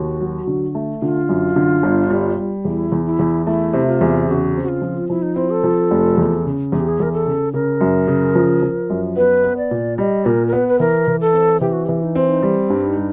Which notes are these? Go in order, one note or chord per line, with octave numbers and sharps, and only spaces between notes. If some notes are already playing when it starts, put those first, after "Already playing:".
Already playing: D#2 F#4
F#3
D3
A3
D3 F4
F#2
D3
G1
G3
G3
E2 E4
E2
E4
E2
A3 E4
C3
F4
E2
C#3 F#4
C4
F#4
F4
F3
F3 E4
D#4
C4 E4
A4
F3
F1
E2
C#3
E2 G#4
G4
G#4
E2 A#4
A4
C#3
C#3 A#4
F#2
C#3
F3
F3
F#2
B3 B4
B3
D5
A#2
G3 D#5
A#2 A#4
A#4
B3 B4
B4
E3 A#4
E3
A4
C4
E3 G4
F#4
E3 G4
D#4
C4
D#4
G3
G2
D#4
G3